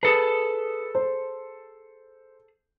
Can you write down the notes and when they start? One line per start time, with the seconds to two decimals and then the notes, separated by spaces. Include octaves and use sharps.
0.03 G#4 A4 B4 D#6
0.95 C5